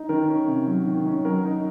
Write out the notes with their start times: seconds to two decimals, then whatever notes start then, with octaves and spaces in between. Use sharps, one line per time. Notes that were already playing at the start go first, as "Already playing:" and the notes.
Already playing: D#4
0.09 D#3 A#4
0.28 C#4
0.48 C3
0.67 F#3
0.86 D#3
1.06 C#4
1.25 F#3 A#4
1.45 D#4